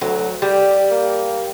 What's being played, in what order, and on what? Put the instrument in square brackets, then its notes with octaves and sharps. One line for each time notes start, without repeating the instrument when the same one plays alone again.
[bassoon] D2 [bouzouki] F#3
[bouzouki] G3 [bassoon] G4
[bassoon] A#3